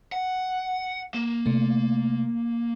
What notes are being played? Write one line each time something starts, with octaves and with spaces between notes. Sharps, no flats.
F#5
A#3
C3 A3